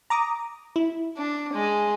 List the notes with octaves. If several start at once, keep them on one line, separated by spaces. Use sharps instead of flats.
A#5 D6 D#6
E4
D4
G#3